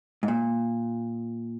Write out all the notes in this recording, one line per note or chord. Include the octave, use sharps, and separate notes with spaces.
G#2
A#2